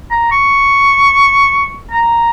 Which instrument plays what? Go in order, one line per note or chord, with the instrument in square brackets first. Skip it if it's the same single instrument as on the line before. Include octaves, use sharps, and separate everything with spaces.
[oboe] A#5
C#6
A#5